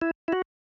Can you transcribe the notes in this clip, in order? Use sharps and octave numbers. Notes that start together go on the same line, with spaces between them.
E4
E4
F#4